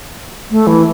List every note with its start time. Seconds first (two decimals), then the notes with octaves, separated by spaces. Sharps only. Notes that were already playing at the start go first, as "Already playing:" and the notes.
0.51 A3
0.67 E3